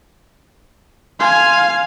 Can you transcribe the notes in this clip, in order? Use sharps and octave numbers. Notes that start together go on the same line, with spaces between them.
F5 G#5 C6